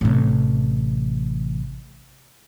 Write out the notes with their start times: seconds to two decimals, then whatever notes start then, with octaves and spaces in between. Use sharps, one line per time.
0.01 A1 C3